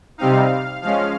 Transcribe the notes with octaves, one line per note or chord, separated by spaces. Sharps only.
C3 G3 C4 D#4 F5
F3 G#3 C#4 F5